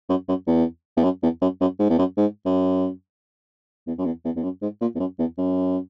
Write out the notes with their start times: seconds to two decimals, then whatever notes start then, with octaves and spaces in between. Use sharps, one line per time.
0.09 F#2
0.28 F#2
0.47 E2
0.97 E2
1.03 F#2
1.23 E2
1.42 F#2
1.61 F#2
1.80 G#2
1.89 E2
1.98 F#2
2.17 G#2
2.46 F#2
3.87 E2
3.98 F#2
4.05 E2
4.25 E2
4.36 E2
4.43 F#2
4.62 G#2
4.81 A#2
4.95 E2
5.00 F#2
5.19 E2
5.38 F#2